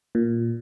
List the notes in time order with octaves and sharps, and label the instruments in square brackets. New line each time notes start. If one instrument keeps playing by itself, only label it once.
[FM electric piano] A#2